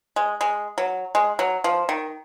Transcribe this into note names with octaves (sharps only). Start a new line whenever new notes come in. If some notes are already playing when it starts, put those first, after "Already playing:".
G#3
G#3
F#3
G#3
F#3
F3
D#3